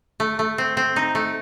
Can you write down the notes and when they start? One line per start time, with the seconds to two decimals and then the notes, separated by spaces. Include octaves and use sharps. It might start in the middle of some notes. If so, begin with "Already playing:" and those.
0.20 A3
0.39 A3
0.58 C4
0.77 C4
0.96 D#4
1.15 A3